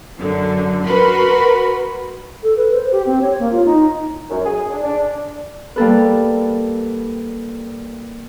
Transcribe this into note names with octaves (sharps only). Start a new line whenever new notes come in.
F#2 D3
F#4 A#4 B4 B5 C6
A4
B4
C5
G4
C4
C#5
A#3
F4
D#4
F#2
G#4
D4
D4
G3 A#3 A4 B4